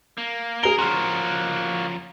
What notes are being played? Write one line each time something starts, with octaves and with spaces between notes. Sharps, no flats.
A#3
G#4 A#4 A#5 G7
F3 A#3 C#4 F#4 C6 F6